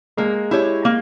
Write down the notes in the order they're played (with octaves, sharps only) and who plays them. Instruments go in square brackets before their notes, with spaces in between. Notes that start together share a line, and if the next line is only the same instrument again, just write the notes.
[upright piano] G#3 [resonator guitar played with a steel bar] A#3
[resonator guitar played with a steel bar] E4 G4 C#5
A#3